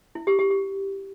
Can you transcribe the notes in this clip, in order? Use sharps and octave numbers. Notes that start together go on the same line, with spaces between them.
E4
G4
G4
G4